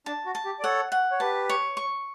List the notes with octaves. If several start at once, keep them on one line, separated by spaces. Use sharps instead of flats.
D4 A5
F#4
A5
G4
D5
A4 C#5 F#5
F#5
C#5
G4 B4 A5
C#5
C#6